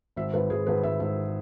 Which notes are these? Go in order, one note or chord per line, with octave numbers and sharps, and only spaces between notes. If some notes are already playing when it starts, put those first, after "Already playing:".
G#1 E5
G#1 B4
G#1 G#4
G#1 B4
G#1 E5
G#1 E5